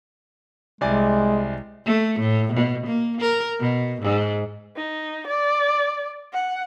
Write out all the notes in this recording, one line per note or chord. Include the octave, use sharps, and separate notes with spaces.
C2 G#3 D5 G#5
A3
A2
B2
A#3
A#4
B2
G#2
D#4
D5
F#5